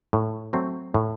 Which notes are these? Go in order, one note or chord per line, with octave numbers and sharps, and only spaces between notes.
A2
F#3 A3 C4
A2